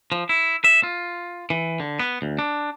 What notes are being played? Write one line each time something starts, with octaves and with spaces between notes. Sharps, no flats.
F3
E4
E5
F4
E3
D3
B3
D2
D4